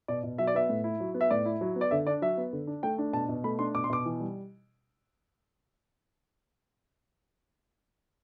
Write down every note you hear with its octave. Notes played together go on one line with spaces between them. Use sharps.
B2 D5
B2
F#3 E5
D5
B3 E5
A2
E4
F#3
B3
E5
A2 D5
E4
F#3
B3
D5
D3 E5
D4 D5
F#3 E5
B3
D3
D4
A3 G5
D4
B2 A5
B2
A3 B5
D4 C6
B2 D6
C6
B2 D6
E3
G3